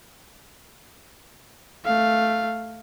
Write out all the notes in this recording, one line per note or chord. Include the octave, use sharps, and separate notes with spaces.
A3 F5